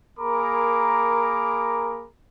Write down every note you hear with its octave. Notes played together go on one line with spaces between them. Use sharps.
A#3 G#4 A#4 A#5 B5 D6